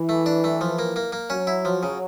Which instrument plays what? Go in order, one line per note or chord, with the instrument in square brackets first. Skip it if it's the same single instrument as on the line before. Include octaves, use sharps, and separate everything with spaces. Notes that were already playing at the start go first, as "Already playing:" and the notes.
Already playing: [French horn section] E3
[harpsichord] A3
D4
A3
F3
A#3
A#3
A#3
[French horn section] F#3 [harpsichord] C#4
[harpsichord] E4
F3
C#3